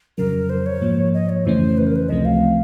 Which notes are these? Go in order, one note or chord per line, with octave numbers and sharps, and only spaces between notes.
F2 C#3 F#3 A#4
C5
C#5
G#2 F3 A#3
D#5
C#5
F2 C#3 E3 A3 C#4 C5
B4
A#4
B4
C#2 C3 F3 A3 C4 D#5
F5